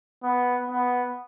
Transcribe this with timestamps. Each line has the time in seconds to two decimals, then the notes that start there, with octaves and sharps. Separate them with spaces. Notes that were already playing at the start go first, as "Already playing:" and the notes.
0.23 B3
0.70 B3